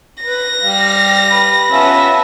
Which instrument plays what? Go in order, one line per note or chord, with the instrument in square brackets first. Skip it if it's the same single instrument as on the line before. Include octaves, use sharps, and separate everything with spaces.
[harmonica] B4 [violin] A#6
[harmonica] G3 G4 F5
[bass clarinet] B4
[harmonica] B3 C#4 F4 [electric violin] E5 A5